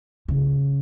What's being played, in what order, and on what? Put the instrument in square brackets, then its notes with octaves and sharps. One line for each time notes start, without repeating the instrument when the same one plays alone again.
[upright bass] C#3